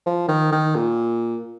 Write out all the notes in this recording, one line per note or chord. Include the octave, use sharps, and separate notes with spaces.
F3
D#3
D#3
A#2